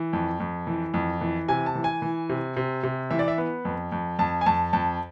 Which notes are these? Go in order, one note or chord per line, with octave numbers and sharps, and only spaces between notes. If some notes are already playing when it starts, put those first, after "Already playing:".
Already playing: E3
F2
F2
E3
F2
E3
C3 G#5
A5
E3
G#5
E3
C3
C3
C3
E3 E5
D5
E5
B3
F2
F2
F2 A5
G#5
F2 A5
F2 A5